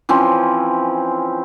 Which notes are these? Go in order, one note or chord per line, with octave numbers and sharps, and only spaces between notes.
E3 F3 C4 C#4